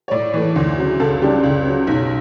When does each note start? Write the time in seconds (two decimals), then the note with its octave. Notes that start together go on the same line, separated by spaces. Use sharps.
0.08 C#5
0.11 A2 D5
0.34 E3 A3
0.56 D2
0.78 C#3 F#3
1.00 C#2 A4
1.22 C#3 G3 D4 G4
1.43 C#2
1.65 C#3 F#3
1.87 B1